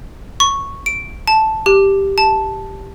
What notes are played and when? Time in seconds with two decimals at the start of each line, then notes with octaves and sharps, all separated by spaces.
0.40 C#6
0.86 D7
1.28 A5
1.66 G4
2.18 A5